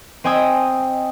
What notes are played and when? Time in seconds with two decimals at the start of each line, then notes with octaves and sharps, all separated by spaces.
0.24 C4 D#5 G5 G#5 D#6 E6